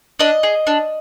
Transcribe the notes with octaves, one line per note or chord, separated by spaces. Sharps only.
D4 D#5
G#4
D4